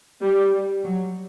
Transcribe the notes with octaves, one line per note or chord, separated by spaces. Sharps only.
G3
F#3